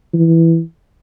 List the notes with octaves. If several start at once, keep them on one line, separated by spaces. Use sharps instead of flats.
E3